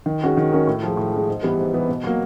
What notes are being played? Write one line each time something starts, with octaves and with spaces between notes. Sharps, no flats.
D#3
G#3 C#4 F#4 A#4
D#3
G#3 C#4 F#4 A#4
A2
F3 G#3
A2
F3 G#3
G#2
E3 G3 B3
G#2
E3 G3 B3
B2
F#3 A#3